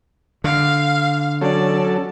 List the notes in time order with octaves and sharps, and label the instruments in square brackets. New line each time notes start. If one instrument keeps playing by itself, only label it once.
[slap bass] D3 [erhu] F5
[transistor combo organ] F#3 C#4 A4 [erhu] D5